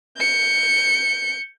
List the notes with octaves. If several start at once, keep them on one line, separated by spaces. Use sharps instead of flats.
G6 C#7